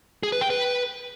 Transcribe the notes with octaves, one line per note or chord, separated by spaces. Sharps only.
G#4
B4
G5
B4